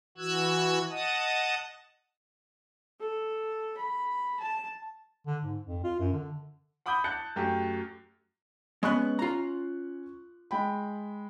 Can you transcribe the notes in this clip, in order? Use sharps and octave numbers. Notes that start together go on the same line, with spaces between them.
E3 F#4 E6 F#6 G#6
D#5 F#5 A5 D#6
A4
B5
A5
D3
G#2
F2
F4
F#2
D3
F#5 B5 D6 D#6 G6
A5 F#6 G6 A6 C#7
F#2 A3 G4
G#3 B3 C#4 C#6 F#6
F4 A#5
G#3 G5 B5